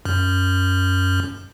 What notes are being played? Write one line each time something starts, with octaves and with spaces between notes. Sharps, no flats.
F#2